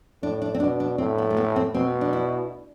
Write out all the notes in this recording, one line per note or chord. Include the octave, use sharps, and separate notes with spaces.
A2 D4
D4
C4
B2 D4
D4
A2 C4
B3
A3
B3
C4
B2 C4
D4
E4